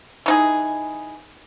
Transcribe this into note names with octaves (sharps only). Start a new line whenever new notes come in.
E3 D#4 G#4